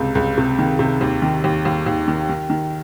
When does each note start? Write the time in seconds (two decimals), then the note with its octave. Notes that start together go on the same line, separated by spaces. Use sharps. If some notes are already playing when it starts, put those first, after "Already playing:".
Already playing: C#2 C3
0.15 C#2
0.38 C3
0.58 D#3
0.79 C3
1.01 D#2
1.22 D#3
1.44 D#2
1.65 D#2
1.86 D#2
2.08 D#3
2.29 D#3
2.50 D#3